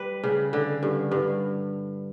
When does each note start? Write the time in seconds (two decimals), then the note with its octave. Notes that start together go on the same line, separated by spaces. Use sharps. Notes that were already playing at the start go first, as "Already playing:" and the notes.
Already playing: G3 B4
0.24 C#3
0.53 D3
0.83 G2
1.11 G2